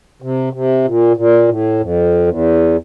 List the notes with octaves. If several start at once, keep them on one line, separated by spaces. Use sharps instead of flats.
C3
C3
A#2
A#2
A2
F2
E2